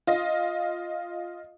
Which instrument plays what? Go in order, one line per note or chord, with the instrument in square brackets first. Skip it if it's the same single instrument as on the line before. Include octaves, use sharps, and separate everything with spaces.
[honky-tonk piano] F4 D#5